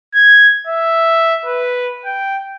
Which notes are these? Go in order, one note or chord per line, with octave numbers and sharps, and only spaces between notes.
G#6
E5
B4
G5